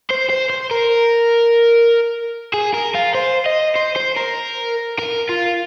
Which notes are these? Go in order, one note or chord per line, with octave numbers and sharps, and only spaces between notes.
C5
C5
C5
A#4
G#4
A#4
F4
C5
D#5
C5
C5
A#4
A#4
F4